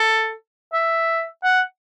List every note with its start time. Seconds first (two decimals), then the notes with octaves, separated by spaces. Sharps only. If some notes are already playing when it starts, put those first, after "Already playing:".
Already playing: A4
0.74 E5
1.44 F#5